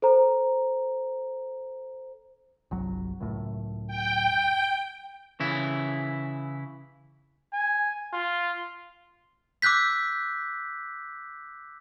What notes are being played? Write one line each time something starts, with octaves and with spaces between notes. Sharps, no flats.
A4 C5 A#5
G1 C2 F#3
C#2 F#2 A2
G5
C#3 E3 E4
G#5
F4
D6 E6 F#6 G6 B6